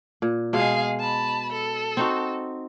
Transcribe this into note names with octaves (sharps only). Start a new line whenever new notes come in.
A#2
B2 G#3 G#4 F5
A5 B5
A4
C4 D#4 F#4